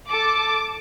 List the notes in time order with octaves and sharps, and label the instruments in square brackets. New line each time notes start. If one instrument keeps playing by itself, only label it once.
[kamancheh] A4 A5 [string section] D6